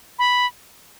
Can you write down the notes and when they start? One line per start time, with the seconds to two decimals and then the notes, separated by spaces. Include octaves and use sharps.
0.19 B5